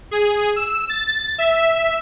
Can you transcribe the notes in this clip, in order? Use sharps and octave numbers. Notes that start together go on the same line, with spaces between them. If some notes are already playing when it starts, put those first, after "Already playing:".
G#4
E6
A6
E5